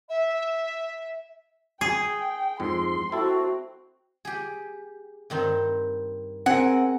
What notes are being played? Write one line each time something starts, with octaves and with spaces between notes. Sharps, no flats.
E5
G#4 G5
F2 G#2 C6
C4 E4 F#4 A4
G4 G#4
G2 D#3 C4
C4 G#4 A#4 F#5